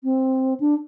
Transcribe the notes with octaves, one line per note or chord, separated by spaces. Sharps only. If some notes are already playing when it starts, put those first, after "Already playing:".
C4
D4